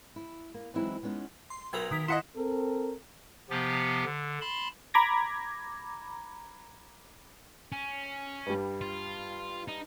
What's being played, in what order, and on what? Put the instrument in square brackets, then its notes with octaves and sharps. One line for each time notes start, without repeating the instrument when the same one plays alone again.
[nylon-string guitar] E4
A#3
E3 F#3 G#3 C4 D#4 E4
G3 G#3 B3 C#4 D#4
[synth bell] C6
[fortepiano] B1 [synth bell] A#4 B4 G#6
[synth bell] D#3 B6
[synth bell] E4 [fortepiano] D#5 F#5 C6
[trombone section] C4 A4 A#4
[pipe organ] C3 F3 B3 G4
D3
A5 B5 C6
[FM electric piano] A#5 B5 D6 G#6 A#6
[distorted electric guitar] C#4
[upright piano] G2 G3
[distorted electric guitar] F4
D#4